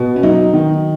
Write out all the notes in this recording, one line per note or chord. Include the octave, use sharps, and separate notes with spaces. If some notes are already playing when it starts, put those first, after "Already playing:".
Already playing: B2
C#4
F#3 D#4
D#3